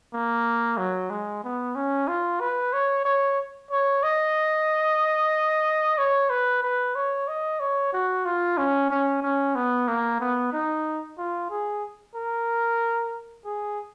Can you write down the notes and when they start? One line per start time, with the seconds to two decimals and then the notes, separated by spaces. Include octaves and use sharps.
0.13 A#3
0.77 F#3
1.10 G#3
1.43 B3
1.75 C#4
2.08 F4
2.40 B4
2.73 C#5
3.05 C#5
3.71 C#5
4.03 D#5
5.98 C#5
6.30 B4
6.63 B4
6.95 C#5
7.28 D#5
7.60 C#5
7.93 F#4
8.25 F4
8.57 C#4
8.90 C#4
9.22 C#4
9.55 B3
9.88 A#3
10.20 B3
10.53 D#4
11.18 F4
11.50 G#4
12.15 A#4
13.45 G#4